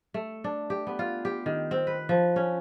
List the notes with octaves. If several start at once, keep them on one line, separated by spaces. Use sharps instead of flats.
A3
D4
G4
B3
F4
G4
D#3
C4
B4
F3
C#4